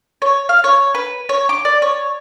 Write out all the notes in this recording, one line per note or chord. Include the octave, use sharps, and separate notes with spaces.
C#5
F5
C#5
B4
C#5
D6
D5
C#5